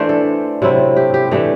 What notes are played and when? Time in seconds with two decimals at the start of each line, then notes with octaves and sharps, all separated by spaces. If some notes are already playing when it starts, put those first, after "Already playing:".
Already playing: E3 A3 D4 C5 D5 E5
0.09 A4
0.62 C3 F#3 C4 E4
0.97 G4
1.14 G4
1.31 E3 A3 D4 G4